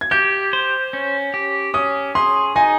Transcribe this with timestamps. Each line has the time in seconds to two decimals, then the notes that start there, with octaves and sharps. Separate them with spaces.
0.01 G#6
0.11 G4 G6
0.53 C5
0.93 C#4
1.34 G4
1.74 C#4 D#6
2.15 G#4 C6
2.56 D#4 G#5